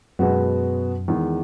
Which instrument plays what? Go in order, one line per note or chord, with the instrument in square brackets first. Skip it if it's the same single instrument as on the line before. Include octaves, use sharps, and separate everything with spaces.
[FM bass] F#2 [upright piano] B2 G#3 B3 F#4 B4
[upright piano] E2 D#3 G#3